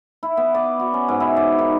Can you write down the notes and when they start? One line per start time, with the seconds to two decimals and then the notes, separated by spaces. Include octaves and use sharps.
0.23 E4
0.37 B3
0.54 D5
0.79 F#4
0.94 C#4
1.09 G#2
1.20 E4
1.36 D5
1.59 D#3